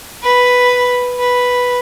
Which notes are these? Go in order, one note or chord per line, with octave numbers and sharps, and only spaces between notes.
B4
B4